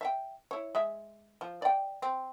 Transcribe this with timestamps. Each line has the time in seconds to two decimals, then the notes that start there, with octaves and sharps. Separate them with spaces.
0.01 E5 F5 G5
0.51 E4 C#5
0.75 G#3 E5
1.41 F3
1.62 D5 G5
2.02 C4